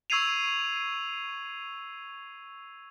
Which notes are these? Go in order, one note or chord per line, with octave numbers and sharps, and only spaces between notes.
C#6 E6 G#6 C7 D#7 F7